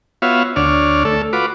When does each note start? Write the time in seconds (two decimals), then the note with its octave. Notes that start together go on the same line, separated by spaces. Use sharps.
0.22 B3 F4 F#4 C#5 E5 F5
0.56 D2 D4 C#5 D5 F6
1.05 A3 A4
1.33 F4 F#4 B4 D6